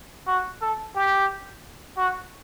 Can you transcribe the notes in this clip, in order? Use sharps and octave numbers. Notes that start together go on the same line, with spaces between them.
F#4
A4
G4
F#4